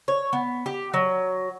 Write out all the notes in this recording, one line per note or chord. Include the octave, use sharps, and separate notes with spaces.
C#5
B3
G4
F#3